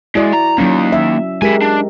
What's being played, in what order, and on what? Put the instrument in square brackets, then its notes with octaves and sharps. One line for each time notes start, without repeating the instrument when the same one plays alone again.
[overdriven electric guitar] G#3 [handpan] E4 F#4 D5
[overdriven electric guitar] A#5
[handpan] F#3 C#4 [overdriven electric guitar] A#3 D#4
[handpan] E5
[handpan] G#3 G4 A#4 [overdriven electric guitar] E5 G#5
[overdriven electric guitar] D4